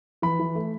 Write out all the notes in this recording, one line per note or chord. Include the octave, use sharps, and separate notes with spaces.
E3 B5
E3
A3